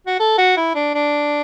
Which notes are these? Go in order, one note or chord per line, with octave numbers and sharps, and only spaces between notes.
F#4
A4
F#4
E4
D4
D4